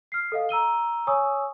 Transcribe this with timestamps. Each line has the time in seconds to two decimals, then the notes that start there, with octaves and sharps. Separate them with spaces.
0.12 F6 C7
0.32 A4 D#5 F5
0.49 A#5 E6 D#7 G7
1.07 C#5 G#5 C#6 D#6 E6